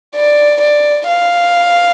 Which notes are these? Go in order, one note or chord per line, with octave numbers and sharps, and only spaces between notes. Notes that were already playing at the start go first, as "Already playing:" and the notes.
D5
D5
F5